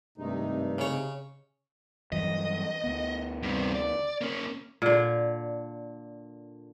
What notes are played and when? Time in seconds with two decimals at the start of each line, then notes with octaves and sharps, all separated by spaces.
0.18 G#1 G2 C3 A3 D#4
0.78 C#3 C#5
2.12 G2 E3 F#3 D#5
2.84 D2 B3
3.43 G2 C3
3.75 D5
4.21 A#3 C#4
4.82 A#2 D3